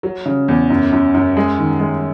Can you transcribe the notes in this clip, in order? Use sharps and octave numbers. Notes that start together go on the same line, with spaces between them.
F#3
C#3
E2
F#2
F#2
F#2
G#3
D#3
G#3